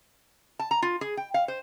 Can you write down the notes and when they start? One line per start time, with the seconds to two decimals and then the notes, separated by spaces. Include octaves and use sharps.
0.59 A5
0.71 A#5
0.82 F4
1.01 G#4
1.17 G5
1.34 F5
1.48 C5